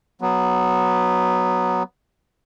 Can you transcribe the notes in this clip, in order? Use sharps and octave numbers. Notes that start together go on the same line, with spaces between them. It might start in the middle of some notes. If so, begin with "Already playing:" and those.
F#3 B3